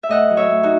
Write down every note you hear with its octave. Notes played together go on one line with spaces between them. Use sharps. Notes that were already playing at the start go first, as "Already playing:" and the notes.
E5
A2 D#5 F#5
F#3
C#5 E5
A2
D#4 F#4